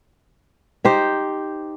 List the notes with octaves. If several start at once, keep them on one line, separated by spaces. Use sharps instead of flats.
D#4 G4 C5